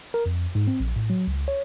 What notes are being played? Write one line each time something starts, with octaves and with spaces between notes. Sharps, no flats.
A#4
F2
G#2
C4
A#1
A2
F#3
C#2
C#5